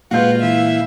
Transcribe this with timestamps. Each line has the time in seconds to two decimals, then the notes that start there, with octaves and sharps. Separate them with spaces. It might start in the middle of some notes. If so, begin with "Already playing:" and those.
0.11 A#2 G#3 F4 F#4 B4 F5 G6
0.43 E3 E5